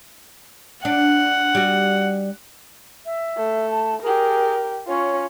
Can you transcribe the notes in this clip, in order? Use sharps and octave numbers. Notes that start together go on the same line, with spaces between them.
D4 F#5
G3 F#4
E5
A3
A5
G4 G#4 A#4
C#4 F4 C#5